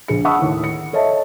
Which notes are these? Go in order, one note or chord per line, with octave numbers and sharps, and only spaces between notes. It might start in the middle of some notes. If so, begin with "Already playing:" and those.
A#1 G#4 C#7
F#5 A5 B5 C#6 D#6 E6
D#2 A2
C#7
A4 C#5 D#5 E5 A5